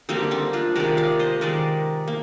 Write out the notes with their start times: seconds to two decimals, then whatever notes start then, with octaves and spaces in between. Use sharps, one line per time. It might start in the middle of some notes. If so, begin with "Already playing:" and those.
0.09 D3 G3 A#3 C4 D#4
0.31 C4 D#4
0.53 D4 F4
0.75 C3 D#3 G#3 A#4 D5
0.97 D5 F5
1.19 C5 D#5
1.41 D#3 G#3 A#4 D5
2.08 A#3